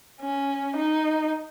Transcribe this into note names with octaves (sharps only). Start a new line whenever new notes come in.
C#4
D#4